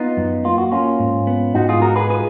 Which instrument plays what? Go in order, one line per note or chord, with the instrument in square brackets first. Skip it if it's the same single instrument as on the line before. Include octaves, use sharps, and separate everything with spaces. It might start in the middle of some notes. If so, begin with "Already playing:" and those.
Already playing: [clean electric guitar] B3 D#4 [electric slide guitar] F4
[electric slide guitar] F#2
[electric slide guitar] A#3 [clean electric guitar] F4
[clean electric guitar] F#4
[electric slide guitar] A#3 [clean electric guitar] C#4 F4
[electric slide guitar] G#2
B3
[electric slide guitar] G#2 [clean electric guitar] D#4 F#4
[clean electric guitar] F4 G#4
[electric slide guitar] D#4 [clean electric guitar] F#4 A#4
[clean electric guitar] G#4 B4
[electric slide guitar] F4 [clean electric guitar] G#4 B4